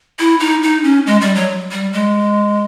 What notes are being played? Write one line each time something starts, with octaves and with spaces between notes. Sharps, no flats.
E4
D#4
D#4
C#4
G#3
G3
F#3
G3
G#3